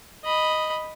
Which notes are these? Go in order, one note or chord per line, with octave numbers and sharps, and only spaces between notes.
D#5 B5